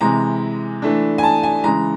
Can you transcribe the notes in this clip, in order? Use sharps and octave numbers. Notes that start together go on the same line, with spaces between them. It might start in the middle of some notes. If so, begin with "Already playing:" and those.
C3 E3 G#3 A#5
E3 A3 D4
G#5
A5
G#5
C#3 E3 G#3 A#5